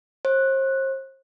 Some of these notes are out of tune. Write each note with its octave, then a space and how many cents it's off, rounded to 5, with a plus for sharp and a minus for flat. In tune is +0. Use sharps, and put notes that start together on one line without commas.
C5 +40